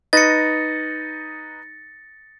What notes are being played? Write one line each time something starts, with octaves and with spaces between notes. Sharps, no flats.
D#4 B4 D#5 A6 A#6 C#7